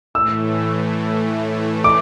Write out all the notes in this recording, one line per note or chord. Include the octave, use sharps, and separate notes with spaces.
A2 E3 A3 E6
D6